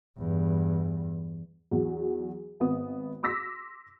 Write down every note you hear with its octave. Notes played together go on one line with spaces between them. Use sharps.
E2 G2
E2 F#3
G#1 B3 D#6
C6 D6 E6 A#6 B6